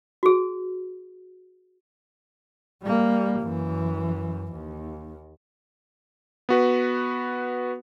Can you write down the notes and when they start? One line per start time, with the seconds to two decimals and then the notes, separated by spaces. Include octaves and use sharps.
0.23 F#4 G#4
2.83 G3 A#3
3.40 F#2 E3
4.52 D#2
6.49 B3 F#4 B4